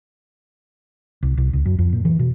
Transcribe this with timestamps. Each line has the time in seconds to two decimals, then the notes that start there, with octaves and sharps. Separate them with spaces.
1.23 C2
1.37 C2
1.53 C#2
1.65 F#2
1.79 F2
1.92 A#2
2.05 E3
2.19 B2